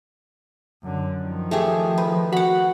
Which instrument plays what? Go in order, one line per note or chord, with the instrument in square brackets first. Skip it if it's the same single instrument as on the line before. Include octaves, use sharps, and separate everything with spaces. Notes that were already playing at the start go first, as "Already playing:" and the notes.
[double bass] F#2 D3
D#3 F3
[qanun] A3 G4 G#4
B4
[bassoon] F#4 [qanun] F#5 B5